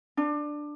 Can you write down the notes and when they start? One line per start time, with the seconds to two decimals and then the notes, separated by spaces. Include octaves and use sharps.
0.17 D4